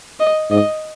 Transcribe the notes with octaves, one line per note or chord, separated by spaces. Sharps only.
D#5
G#2 D#5